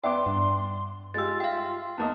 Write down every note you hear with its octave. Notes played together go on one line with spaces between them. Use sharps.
E2 B3 D5 E5 G5 C6 D6
G2 D4
G#3 F4 G4 E6 A6
E5 F5 G5
E2 A#3 D#5 A5